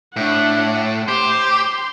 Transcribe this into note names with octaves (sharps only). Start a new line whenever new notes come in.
A2 D4 F#5
G4 C5
C6